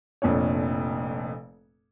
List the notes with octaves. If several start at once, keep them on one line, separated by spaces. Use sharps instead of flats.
F1 F2 A#2 D4 C#5